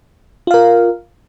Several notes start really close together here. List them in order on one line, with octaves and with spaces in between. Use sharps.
F4 F5 A#4